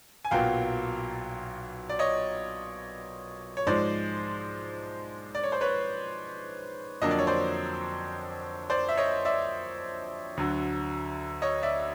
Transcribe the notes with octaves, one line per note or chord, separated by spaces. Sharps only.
G#5
B1 A#2 F#3 B3 F5 G5
D5
C#5 D#5
C#5
G#2 F3 G#3 C5 D5
D5
C#5
C5
B4 C#5
F2 D3 F#3 A#3 D4 D#5
D5
C#5
C5 D5
C5 D5
E5
C#5 D#5
D5 E5
D2 D3 F#3
C#5 D#5
D5 E5